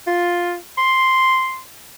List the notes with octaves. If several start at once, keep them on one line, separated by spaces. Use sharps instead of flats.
F4
C6